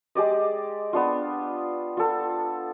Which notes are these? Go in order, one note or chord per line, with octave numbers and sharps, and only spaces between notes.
G#3 G4 D5 D#5
B3 D4 F4
F4 A4